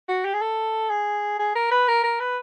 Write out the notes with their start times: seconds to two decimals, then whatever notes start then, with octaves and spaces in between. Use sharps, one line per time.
0.09 F#4
0.25 G4
0.34 G#4
0.41 A4
0.90 G#4
1.39 G#4
1.55 A#4
1.71 B4
1.88 A#4
2.04 A#4
2.20 B4